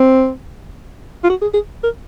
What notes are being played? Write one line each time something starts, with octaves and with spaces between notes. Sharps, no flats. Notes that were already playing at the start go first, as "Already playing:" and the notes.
Already playing: C4
F4
F#4
G#4
G#4
A#4